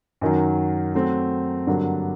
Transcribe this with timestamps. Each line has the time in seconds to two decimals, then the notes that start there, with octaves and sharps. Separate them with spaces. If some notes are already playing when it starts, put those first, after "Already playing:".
0.21 F#2 D#3 F#3
0.94 F#3 A3 C4
1.67 G2 D3 F#3 A#3